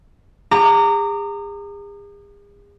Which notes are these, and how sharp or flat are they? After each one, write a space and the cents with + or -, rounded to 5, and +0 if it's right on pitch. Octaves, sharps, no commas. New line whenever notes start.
G#4 -40 A#5 -25 D6 -5